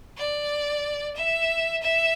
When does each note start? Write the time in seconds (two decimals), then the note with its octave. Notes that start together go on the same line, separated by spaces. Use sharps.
0.18 D5
1.16 E5
1.82 E5